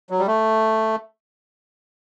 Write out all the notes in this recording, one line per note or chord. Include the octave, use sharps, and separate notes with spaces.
F#3
G3
A3